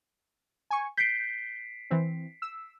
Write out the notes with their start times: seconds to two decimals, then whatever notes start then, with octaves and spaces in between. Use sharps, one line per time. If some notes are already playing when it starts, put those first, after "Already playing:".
0.70 G#5 C#6
0.97 G6 B6 C7 D7
1.91 E3 C4
2.42 E6